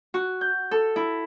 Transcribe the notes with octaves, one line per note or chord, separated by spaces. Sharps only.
F#4
G6
A4
E4